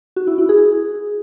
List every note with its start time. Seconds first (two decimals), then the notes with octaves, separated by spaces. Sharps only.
0.16 F#4
0.27 E4
0.38 E4
0.49 G#4